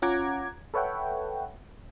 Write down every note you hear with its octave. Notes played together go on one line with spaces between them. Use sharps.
C#4 F4 F#5 A#5 D6 G#6
A4 B4 C#5 E5 F#5 G5